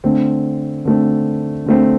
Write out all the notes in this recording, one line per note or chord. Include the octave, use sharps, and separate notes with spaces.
D3 A3 C4
D3 A3 C4
D3 A3 C4